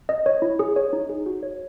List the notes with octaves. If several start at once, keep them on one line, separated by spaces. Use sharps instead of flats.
D#5
C#5
E4
G#4
C#5
D#4
G#4
F#4
C#5